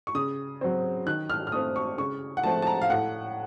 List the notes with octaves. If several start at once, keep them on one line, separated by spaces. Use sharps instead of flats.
C#6
C#3 D#6
F#3 C4
D#3 F#6
F6
F6
A3 C4 D#6
C#6
C#3 C#6
F#5
F3 A3 C4 A5
A5
A#5
F5
A2 F#5